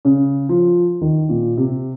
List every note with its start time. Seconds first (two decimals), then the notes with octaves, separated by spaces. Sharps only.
0.05 C#3
0.49 F3
1.01 D#3
1.29 A#2
1.57 C3